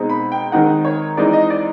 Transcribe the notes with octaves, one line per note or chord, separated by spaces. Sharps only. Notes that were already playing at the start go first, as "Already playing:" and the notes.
Already playing: B2 G#3 C4 D#4
B5
G5
D#3 G#3 C4 D#4 F#5
C#5
E3 G#3 C4 D#4 D5
D#5
D5